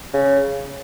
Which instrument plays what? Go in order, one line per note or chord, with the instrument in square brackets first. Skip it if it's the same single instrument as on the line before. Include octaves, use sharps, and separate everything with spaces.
[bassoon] C#3